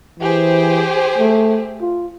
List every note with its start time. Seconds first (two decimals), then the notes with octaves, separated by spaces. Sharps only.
0.19 E3 G4 G#4 C5
1.18 A3
1.81 F4